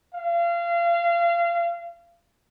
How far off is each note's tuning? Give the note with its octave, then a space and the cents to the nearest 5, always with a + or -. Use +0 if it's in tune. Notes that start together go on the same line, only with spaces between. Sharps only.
F5 -30